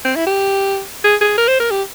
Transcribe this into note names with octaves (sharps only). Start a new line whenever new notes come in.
C4
E4
G4
G#4
G#4
A#4
C5
A#4
G4